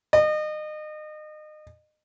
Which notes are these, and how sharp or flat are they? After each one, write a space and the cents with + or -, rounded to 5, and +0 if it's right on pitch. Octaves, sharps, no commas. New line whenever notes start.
D#5 -30